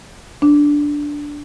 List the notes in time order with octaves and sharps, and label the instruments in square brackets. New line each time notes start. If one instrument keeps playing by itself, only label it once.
[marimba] D4